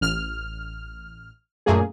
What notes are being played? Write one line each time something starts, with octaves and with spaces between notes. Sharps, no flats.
A1 F6
F#2 A#2 A3 A#3 G#4